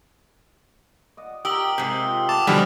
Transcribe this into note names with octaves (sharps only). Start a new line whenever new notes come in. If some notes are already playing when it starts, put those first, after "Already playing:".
D5 D#5 F#5
G4 A#4 G5 D#6 E6 F#7
G#2 C3 D#3
C4 F4 G4
A3 F#5 A5 D6
B2 D3 E3 F3 G3 F#4 F6